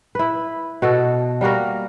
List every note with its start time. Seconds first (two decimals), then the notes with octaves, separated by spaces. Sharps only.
0.15 E4 B4
0.82 B2 F#4 A4
1.41 G3 A#3 F#4 A#4